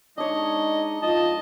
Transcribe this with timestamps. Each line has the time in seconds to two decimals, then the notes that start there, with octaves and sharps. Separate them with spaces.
0.17 G#3 D4 D#4 C#5 D#5
1.03 F2 F4 D#5 A5